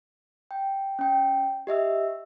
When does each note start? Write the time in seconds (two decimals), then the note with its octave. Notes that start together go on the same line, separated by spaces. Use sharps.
0.51 G5
0.99 C#4 G5
1.67 G4 D#5 E5 E6